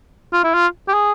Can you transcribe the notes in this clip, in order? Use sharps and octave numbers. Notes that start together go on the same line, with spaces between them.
F4
E4
F4
G4
G#4